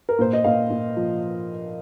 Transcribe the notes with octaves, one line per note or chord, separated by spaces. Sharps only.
A#4
A#2 C5
D#5
A#2 F5
A#2
F3